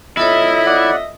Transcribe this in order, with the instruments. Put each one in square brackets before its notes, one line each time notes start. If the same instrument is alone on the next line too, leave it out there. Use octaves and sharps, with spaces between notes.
[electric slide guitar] E4 [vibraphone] F4 A4 C#5 [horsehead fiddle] D#5 E5
[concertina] D5 F#5